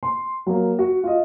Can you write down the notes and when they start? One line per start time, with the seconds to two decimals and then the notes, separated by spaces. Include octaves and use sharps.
0.03 C6
0.46 F#3 A#3
0.79 F#4
1.04 F4 D#5